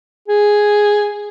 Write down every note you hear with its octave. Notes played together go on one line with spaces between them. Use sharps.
G#4